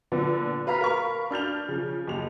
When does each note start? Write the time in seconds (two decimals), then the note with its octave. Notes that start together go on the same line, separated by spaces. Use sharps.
0.12 A#2 D3 F3 B3
0.67 B4 F5 A#5 F6 B6
0.81 A#4 F5 B5 C#6
1.31 D4 F6 G6 F7
1.69 C#3 F3
2.07 F#1 D#2 F7